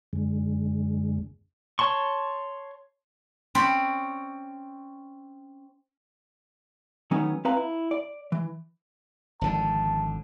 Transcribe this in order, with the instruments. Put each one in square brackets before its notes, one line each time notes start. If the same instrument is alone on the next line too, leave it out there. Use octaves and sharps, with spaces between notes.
[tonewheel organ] F#2 D3 G#3
[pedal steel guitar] C#5 A5 C6 C#6
[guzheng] C4 C#4 C5 D5 B5
[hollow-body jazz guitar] D#3 F#3 A3 B3 C#4 D#4
C4 B4 F5 A#5
E4
D5
E3
[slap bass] G#1 D3 F3 [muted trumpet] A5